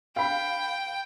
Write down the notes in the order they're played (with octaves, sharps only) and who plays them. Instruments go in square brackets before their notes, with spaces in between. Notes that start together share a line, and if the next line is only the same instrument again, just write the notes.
[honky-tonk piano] F5 B5 [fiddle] G5